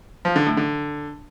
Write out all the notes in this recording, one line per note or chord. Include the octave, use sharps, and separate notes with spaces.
F3
D3
A2
D3